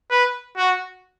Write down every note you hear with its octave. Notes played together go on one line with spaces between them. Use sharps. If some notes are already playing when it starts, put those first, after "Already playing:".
B4
F#4